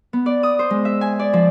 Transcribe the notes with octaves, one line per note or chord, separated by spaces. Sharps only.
B3
D5
D#6
C5
G#3
E5
G#5
D5
F3